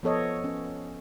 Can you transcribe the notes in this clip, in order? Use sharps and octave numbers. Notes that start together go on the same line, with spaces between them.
F3 B3 A4 C#5 D#5
C#4